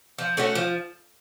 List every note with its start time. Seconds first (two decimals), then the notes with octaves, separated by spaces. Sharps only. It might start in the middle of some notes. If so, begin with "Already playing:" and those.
0.18 F3
0.37 A3 C#4 F#4
0.55 F3